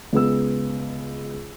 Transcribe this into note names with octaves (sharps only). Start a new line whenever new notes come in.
C#2 G#3 B3 E6